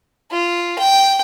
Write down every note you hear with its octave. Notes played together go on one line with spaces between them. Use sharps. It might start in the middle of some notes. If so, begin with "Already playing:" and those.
F4
G5